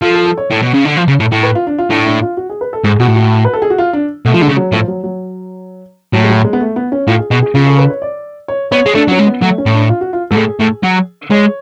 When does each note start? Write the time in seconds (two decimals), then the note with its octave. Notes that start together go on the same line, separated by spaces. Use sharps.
0.02 F3 A4
0.14 A4
0.26 A4
0.38 C#5
0.50 A2
0.62 B2
0.74 C#3
0.85 D3
0.96 F3
1.08 C#3
1.20 A2
1.32 A2
1.43 B4
1.55 F4
1.67 D4
1.79 F4
1.90 A2 D4
2.06 D4
2.22 F4
2.37 F#4
2.50 G#4
2.61 B4
2.73 A4
2.84 G#2 G#4
3.00 B2 F#4
3.07 A2
3.16 F#4
3.45 B4
3.53 A4
3.62 G#4
3.70 F#4
3.78 F4
3.93 D4
4.25 B2 A3
4.34 F3
4.41 D3 G#3
4.49 C#3
4.57 F#3
4.72 A2 F3
4.88 F#3
5.04 F#3
6.13 A2 F#3
6.24 G#3
6.29 F#3
6.45 G#3
6.53 B3
6.60 A3
6.76 B3
6.92 C#4
7.08 A2 F4
7.19 G#4
7.31 B2 G#4
7.42 G#4
7.54 C#3 F4
7.66 A4
7.78 B4
7.90 C#5
8.02 D5
8.48 C#5
8.72 B3 C#5
8.86 G#3
8.95 A3 D4
9.08 F#3 C#4
9.19 G#3
9.27 B3
9.42 F#3 A3
9.58 C#4
9.66 A2
9.74 D4
9.89 F4
10.01 F#4
10.13 F4
10.31 G#2 A4
10.37 A2 G#4
10.60 A2
10.83 F#3
11.30 G#3 C#5